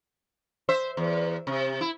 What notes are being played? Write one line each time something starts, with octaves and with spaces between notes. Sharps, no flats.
C5 E5
E2
C3
E4